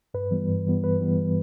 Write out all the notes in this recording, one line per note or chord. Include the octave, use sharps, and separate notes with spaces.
G2 B4
E3 G3 B3
G2
E3 G3 B3
G2 B4
E3 G3 B3
G2